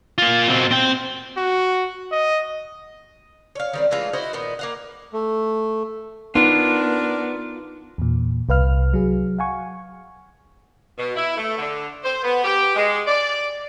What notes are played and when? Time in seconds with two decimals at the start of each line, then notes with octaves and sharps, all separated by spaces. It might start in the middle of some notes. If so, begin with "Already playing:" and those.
0.18 A#3 F4
0.48 B2 C4
0.71 C4 G5
1.37 F#4
2.12 D#5
3.55 C#5 F5
3.73 D#3 G3 C4
3.91 E3 G#3 A3 F4
4.13 E4 F#4 C5 D#5
4.33 A#2 D#3 B3
4.59 A#3 F5 F#5
5.13 A3
6.35 B3 D4 D#4 F4 A#4 D5
7.98 E2 A#2
8.49 C2 B4 F5 F6
8.94 F#3 G#4
9.39 F5 F#5 G#5 C#6
10.98 B2
11.16 E4
11.37 A3
11.57 D3
12.04 C5
12.23 B3
12.44 G4
12.76 G#3
13.07 D5